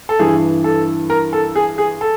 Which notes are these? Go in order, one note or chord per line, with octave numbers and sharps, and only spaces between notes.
A4
G2 E3 G#4
A4
A#4
A4
G#4
G#4
A4